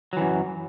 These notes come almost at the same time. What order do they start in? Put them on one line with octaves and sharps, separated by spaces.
F#3 E3 F#2